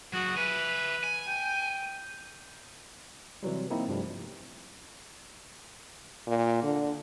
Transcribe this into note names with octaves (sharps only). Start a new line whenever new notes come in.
F#3 F#4 G#4
B4 E5 G#5
G#5
G5
C3 E3 F#3 G3
A#3 C4 D#4 E4
G2 C3 F3 G3 A3
A#2
D3